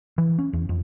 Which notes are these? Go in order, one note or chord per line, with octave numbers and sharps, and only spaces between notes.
E3
C#4
E2
F2